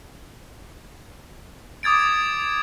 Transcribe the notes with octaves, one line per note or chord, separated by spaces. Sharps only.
D6 D#6 G#6 A6 D7